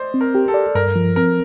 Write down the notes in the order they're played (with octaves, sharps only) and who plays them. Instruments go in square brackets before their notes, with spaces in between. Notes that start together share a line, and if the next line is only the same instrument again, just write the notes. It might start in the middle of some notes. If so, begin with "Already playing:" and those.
Already playing: [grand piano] C5 D5 D#5
[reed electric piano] C4
[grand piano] A#4
[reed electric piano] G4
[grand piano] A4
[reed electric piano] D5
[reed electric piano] G2 [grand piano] A#4
[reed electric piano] F3
[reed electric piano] C4 [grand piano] A#4